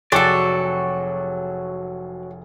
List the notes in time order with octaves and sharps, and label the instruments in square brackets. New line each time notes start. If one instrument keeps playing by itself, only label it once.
[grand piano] F1 G#4 G5 [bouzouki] F#3 F#4 [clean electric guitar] A4 D5